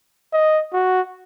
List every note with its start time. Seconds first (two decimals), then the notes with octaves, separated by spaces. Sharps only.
0.33 D#5
0.73 F#4